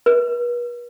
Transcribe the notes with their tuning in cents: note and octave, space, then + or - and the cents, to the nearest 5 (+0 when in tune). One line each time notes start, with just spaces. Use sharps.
B4 -40